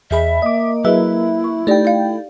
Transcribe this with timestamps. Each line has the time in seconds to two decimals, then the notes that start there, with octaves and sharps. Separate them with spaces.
0.11 E2 G#4 D#5 E5 B5
0.42 A#3 D#5 D6
0.84 F#3 E4 G#4 B4 D#5 E5
1.44 C#6
1.67 A3 D#4 G4 D5 G5
1.85 D5 F5